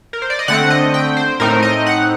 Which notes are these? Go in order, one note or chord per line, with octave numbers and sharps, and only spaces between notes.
A#4
C5
D5
D#5
D3 A3 C4 F#5
D#5
G5
C5
A2 A3 C4 D#4 A#4
D#5
F#5